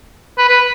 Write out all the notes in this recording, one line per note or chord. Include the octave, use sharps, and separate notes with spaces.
B4
B4